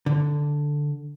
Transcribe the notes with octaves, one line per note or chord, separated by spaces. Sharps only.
D3